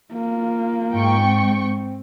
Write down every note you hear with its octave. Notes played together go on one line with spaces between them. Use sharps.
A#3 F4
G#2 G5 C#6
C4